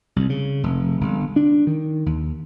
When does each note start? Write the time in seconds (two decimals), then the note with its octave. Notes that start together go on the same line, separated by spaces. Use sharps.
0.16 C2
0.30 C#3
0.63 F1
1.01 G1
1.36 D4
1.67 D#3
2.06 D#2